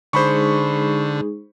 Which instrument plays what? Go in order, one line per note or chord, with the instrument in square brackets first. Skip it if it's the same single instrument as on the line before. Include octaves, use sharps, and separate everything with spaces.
[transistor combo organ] D3 [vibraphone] G#3 D#4 G#4 [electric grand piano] C5 B5 C#6